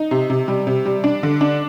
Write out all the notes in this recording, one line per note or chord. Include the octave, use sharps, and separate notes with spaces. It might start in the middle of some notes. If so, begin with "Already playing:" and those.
Already playing: D#4
C3
C3
G3
C3
G3
D4
D3
D4